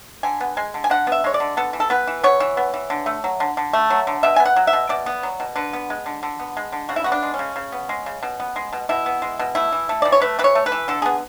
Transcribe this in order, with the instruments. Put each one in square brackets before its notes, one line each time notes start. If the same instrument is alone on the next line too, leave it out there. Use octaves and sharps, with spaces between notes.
[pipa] D3 G#5
B3
G#3 G#5
D3
G#5
D3 F#5
B3 E5
G#3 C#5
D5
D3
B3 A4
E3
A4
B3 B4
E3
B3 C#5
E3
B3
E3
D3
A3
F#3
D3
D3
A3
F#3
D3
B2 E5
B3 G#5
F#5
F#3
E5
B2
B2 D5
B3
F#3
B2
D3 B4
B3
G#3
D3
D3
B3
G#3
D3
C#3 F#4
E4
B3 F#4
D4
G#3
C#4
C#3
C#3
B3
G#3
C#3
B2
B3
G#3
B2
B2 E4
B3
G#3
B2
A3 E4
E3
A3
E3 D5
C#5
A3 B4
E3 B4
C#5
A3
B4
E3
D3 A4
B3 G#4